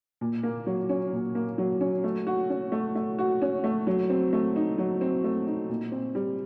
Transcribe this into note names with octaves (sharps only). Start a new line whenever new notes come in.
A#2
A#3
F#3
C#4
A#2
A#3
F#3
C#4
A3
F#4
C#4
A3
A3
F#4
C#4
A3
F#3
C4
A3
D#4
F#3
C4
A3
D#4
A#2
C4
G3